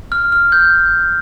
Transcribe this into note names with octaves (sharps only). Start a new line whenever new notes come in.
F6
F6
G6